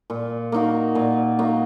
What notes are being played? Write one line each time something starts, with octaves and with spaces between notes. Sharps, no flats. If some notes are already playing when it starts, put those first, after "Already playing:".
A#2
A#3 D#4 F#4
A#2
A#3 D#4 F#4